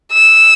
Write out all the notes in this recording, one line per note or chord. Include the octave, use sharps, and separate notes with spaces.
E6